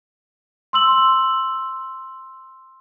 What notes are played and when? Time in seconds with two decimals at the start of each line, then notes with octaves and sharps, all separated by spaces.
0.73 C6 E6 F#7